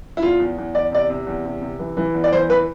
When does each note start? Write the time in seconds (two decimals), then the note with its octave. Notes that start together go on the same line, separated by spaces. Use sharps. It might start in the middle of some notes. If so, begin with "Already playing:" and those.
0.17 E4
0.22 E2 F4
0.40 E2
0.58 E2
0.75 E2 D5
0.92 C3 D5
1.10 C3
1.27 E2
1.45 C3
1.62 C3
1.79 E3
1.97 E3
2.14 E2
2.24 D5
2.32 E3 C5
2.49 E3 B4